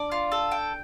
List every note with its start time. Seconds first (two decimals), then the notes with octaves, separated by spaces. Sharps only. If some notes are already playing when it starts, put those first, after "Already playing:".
Already playing: D4 D5
0.12 F4
0.32 A4
0.52 G5